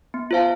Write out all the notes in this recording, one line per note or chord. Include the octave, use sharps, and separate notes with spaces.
B3
F4 C5 F5 A5